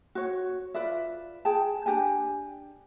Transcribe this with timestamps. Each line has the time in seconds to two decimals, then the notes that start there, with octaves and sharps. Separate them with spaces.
0.15 F#4 C#5
0.74 F4 B4 D5 E5
1.45 G#4 G5 A5
1.86 D4 G4 G5 G#5